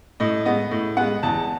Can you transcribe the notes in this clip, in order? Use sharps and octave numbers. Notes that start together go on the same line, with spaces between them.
A2 D#5
G#3 B3 D#5
A2
G#3 B3 F#5
E2 A5